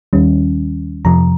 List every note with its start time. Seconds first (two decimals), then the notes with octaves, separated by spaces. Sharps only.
0.13 D#2 D#3 G3 C#4
1.05 F2 C3 F3 A#5